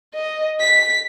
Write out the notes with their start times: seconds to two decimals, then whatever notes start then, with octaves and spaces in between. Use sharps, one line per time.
0.14 D#5
0.60 B6